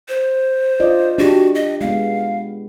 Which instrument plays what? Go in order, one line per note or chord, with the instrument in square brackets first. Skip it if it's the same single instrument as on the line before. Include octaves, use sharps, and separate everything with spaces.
[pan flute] C5
[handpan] F4 D5 D#5
[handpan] D4 G4 [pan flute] F#4
[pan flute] D#5
[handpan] G#3 B3 [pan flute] F5